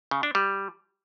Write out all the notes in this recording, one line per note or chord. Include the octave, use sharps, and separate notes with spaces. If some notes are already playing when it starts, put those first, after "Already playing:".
C#3
D4
G3